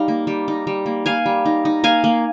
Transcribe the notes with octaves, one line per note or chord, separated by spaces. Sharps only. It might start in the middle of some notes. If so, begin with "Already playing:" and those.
Already playing: G3 D#4 F5
A#3
G3
D#4
G3
A#3
A#3 F5 G#5
G3
D#4
D#4
A#3 F5 G#5
A#3